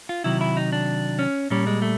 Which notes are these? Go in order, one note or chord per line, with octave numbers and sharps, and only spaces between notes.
F4
C3 D#3 F#3 E4
E4
D#4
D4
C#4
A#2 G3 C#4
G#3
A3